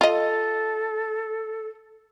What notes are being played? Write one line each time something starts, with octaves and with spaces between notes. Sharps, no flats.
F4 A4 D#5